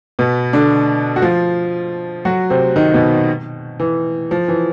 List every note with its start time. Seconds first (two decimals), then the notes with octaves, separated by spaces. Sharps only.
0.19 B2 B3
0.53 D3 D4
1.16 F#4
1.22 F3 F4
2.25 F#3 F#4
2.50 C3 C4
2.76 D#3 D#4
2.94 B2 B3
3.80 E3
4.31 F3
4.48 E3